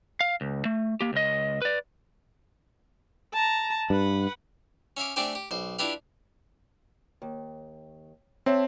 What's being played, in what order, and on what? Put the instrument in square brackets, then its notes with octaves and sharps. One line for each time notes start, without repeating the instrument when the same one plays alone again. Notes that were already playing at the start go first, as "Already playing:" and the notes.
[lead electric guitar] F5
C#2
A3
A#3 G4
C#2 D#5
B4 D5
[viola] A5 A#5
[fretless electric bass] G2 [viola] B4 F#5
[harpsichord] C#4 E5 F5 D6
A3 C4 D4 G4 C5 G#5
G4
B1 C5
D4 E4 F4 G4 B4 F5
[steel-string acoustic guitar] D#2
[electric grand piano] C4 [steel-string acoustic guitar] C#5 E5 A5